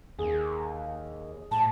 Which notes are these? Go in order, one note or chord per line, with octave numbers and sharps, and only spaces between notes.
D#2 G#4
A2 A5